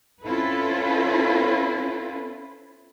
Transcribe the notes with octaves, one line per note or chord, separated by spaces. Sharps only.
C4 C#4 E4 F4 A4 B4